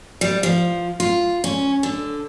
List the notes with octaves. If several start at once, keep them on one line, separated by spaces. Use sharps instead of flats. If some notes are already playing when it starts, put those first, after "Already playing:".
G3
F3
F4
C#4
D3